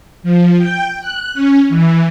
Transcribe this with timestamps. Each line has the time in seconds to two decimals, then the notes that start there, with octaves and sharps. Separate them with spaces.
0.23 F3
0.58 G5
1.01 F#6
1.34 C#4
1.69 E3